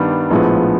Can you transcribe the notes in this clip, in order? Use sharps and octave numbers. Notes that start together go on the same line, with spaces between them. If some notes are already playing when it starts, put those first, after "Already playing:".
Already playing: G2 D#3 G3 B3 D4
A#1 A2 F3 G#3 B3